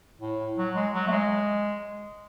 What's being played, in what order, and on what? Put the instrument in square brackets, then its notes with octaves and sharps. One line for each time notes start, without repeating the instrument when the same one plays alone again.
[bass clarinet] A2
F#3
G#3
F#3
A3
G#3